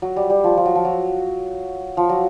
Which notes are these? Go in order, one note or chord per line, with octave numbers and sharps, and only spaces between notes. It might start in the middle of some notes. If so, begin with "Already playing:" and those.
F#3
G3
G3
F3
F3
F#3
F3
F#3
F3
F#3